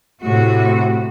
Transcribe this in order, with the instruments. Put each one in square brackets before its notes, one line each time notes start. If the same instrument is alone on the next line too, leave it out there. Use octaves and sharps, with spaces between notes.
[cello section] A2 C3 F#4